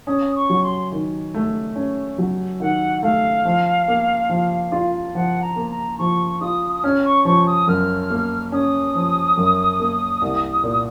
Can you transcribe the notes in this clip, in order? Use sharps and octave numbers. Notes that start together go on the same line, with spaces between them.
C#4 D#6
C#6
F#3
C6
D#3
A3
C#4
F#3
D#3 F#5
A3 F5
F3
A#3
F3
F4
F3 F#5
A#5
A#3
A#5
F3 C#6
F4 D#6
D#6
C#4 F6
C#6
F3 C#6
D#6
F#2 F6
A#3
C#4 D#6
F3
F#2
A#3
C2
A#2